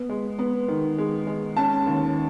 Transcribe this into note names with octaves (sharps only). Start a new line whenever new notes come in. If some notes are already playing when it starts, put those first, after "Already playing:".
Already playing: B3
G#3
B3
D#3
G#3
G#3
C#4 A5
D#2